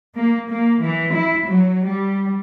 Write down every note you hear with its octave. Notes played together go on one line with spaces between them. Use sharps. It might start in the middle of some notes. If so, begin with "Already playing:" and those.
A#3
A#3
E3
E4
F#3
G3